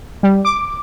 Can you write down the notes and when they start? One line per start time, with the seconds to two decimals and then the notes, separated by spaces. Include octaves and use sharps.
0.23 G3
0.45 D6